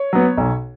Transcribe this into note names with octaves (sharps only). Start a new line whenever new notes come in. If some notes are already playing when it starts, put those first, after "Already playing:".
Already playing: C#5
F#3 B3
B1